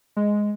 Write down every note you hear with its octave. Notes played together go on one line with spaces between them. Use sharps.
G#3